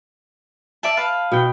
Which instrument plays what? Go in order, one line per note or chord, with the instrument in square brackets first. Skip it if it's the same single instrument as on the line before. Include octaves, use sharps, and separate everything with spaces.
[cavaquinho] D5 E5 A5
B4 F5 A5
[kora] B2 G5